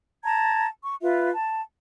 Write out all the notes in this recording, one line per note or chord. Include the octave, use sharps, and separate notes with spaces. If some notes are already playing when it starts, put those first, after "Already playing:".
A5 A#5 G#6
C#6
F4 B4 E5
A5